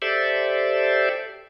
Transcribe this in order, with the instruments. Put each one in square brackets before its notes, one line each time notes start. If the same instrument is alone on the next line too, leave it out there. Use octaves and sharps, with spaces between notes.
[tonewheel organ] G4 A4 C5 D5 E5